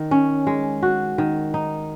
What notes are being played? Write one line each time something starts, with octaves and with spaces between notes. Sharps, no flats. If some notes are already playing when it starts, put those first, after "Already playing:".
Already playing: D#3
C#4
G#3
F#4
D#3
D#4